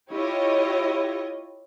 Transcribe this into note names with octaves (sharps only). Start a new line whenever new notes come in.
E4 F4 G4 C#5 D#5